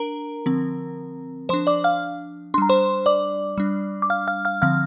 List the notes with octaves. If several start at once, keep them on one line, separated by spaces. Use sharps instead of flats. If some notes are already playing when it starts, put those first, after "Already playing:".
Already playing: D4 A#4 A#5
D3 F3 C4
F3 D4 C5 C6
D5 D6
F5 F6
G3 D4 A#5 C6
C5 C6
D5 D6
G3 D4
D6
F5 F6
F5 F6
F5 F6
D3 F3 C4 F5 F6